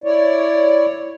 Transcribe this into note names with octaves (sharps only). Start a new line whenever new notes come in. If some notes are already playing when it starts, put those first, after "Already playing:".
E4 C#5 D5